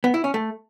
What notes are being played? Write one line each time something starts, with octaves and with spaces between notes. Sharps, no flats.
B3
E4
C#4
A3